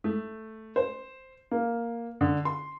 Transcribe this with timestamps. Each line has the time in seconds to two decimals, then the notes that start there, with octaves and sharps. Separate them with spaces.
0.04 A3
0.76 C5
1.51 A#3
2.21 D3
2.45 C6